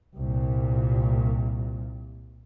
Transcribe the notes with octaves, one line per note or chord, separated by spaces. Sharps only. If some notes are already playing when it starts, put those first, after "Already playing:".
C2 A#2